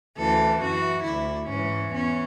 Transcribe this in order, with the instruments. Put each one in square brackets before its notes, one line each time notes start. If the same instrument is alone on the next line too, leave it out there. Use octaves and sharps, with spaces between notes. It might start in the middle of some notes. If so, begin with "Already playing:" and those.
[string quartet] D2 C#3 E3 A4
F#2 E3 F#4
D2 D3 E4
G#2 E3 C#4
E2 C#4